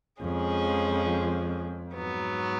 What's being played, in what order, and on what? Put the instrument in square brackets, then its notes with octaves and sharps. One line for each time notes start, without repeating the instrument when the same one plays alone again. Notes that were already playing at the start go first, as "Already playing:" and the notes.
[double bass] F2 [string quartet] F3 G#3 C#4 G#4
[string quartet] G#2 F#3 B3